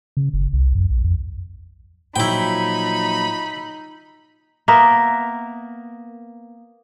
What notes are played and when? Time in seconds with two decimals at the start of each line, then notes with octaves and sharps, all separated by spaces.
0.17 C#3
0.34 F#1
0.53 C2
0.75 F#2
0.90 A#1
1.04 F2
2.16 A#2 F3 F#3 D#4 E4 G5 B5
4.68 A#3 B3 A#4 E5